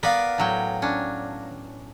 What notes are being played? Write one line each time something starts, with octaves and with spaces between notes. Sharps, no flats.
B3 A#4 B4 D5 F5
A2 F#3 G5
C#4 D4